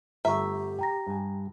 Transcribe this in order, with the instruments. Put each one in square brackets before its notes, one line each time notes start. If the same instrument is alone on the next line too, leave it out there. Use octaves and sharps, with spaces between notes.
[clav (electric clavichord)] G1 A3 A4 [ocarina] G4 [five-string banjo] E5 [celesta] A#5 C#6
[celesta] G5 A#5 A#6
[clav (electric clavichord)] G2 G#5